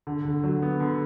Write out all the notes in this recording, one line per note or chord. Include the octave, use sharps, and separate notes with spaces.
D3
D3
F#3
B3
D3